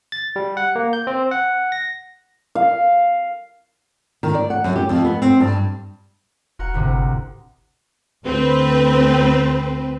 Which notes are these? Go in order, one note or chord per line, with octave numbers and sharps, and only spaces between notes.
A6
G3
F#5
A#3
G6
C4
F#5
A#6
F5
D#3
D5
F#5
F#2
G4
F2
B3
C4
G2
E1 F#4 A#4 F#5
G1 D2 A2 C3
D2 C4 B4